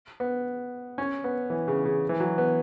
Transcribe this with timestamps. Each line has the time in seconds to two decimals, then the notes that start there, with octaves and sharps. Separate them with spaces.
0.20 B3
0.98 C#4
1.24 B3
1.50 E3
1.68 C#3
1.85 C#3
2.09 E3
2.20 F#3
2.38 B3